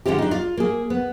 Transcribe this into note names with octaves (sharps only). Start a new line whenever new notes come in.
D3 G#3 C#4 F4 G4
D4 D#4
F4
A#3 G#4
B3